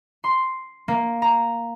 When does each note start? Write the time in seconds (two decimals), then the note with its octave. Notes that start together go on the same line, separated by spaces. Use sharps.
0.24 C6
0.88 A#3
1.22 A#5